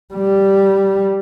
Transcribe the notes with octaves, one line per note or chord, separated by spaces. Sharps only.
G3